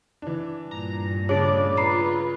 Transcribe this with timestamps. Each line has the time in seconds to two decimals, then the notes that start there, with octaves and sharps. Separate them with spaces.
0.22 E3 D4
0.71 G2 A#2 A#5
1.29 C#3 D4 C#5 D5
1.77 F4 B4 A#5 B5 C7